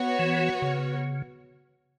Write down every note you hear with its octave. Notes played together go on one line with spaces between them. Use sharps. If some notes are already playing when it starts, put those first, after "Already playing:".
Already playing: B3 F#4 C#5
E3
C#3